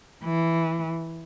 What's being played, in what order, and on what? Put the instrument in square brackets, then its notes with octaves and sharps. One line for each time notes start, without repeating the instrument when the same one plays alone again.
[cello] E3